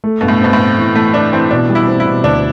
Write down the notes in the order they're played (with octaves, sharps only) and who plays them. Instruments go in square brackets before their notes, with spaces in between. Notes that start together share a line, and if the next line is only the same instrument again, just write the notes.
[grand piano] A3
[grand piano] G2 [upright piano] B2
[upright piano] A2
[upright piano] B2 [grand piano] C4
[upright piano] A2
[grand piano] C4
E3
[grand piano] E3 [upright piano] A3
[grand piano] E3 [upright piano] D4
[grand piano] E3 [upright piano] C4
[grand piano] B2 [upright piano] D4
[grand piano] G3
[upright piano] E4
[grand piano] C4
[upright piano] E4
[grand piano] B2
[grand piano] D2 [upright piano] D4